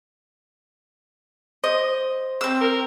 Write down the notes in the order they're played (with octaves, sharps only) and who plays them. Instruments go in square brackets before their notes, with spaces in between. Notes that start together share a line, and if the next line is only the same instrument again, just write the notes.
[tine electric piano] C5 [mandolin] D#5
[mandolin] C4 E6
[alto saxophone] A#4